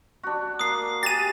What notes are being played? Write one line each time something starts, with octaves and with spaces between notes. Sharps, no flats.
D4 F#4
A#3 D#6 C7
G4 G#4 A6 D#7